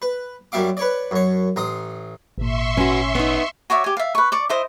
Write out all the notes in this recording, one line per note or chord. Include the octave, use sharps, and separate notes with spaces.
B4
F#2 G3 E5 F5 D6
B4 C#5 D5
F#2 C#5
A1 A#5 C6 D#6
G#1 A#2 E5 C6 C#6
C#4 F#4 B4
B3 D#4
F#4 C#5 D5 E5
G4 G#5
E5 F5
B4 C#6
D5 C#6
E4 C5 D#5